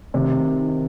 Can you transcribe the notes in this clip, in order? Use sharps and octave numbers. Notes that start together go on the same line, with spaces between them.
C3 D#3